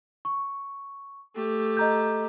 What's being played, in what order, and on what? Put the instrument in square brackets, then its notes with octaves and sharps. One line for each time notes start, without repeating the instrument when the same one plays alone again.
[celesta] C#6
[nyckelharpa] A3 G4
[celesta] D#5 A#5 G6